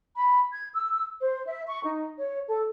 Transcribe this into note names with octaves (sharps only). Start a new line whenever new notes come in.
B5
G#6
E6
C5
E5
C#6
D#4
C#5
A4